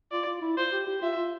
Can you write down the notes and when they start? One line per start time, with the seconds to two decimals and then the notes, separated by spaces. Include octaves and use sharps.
0.11 F4 D5
0.27 F4
0.42 E4
0.57 F4 C5
0.72 G4
0.87 G4
1.02 F4 E5
1.17 F4